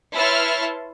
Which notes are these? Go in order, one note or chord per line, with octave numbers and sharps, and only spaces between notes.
E4 B4 C#5 A5 C6 F6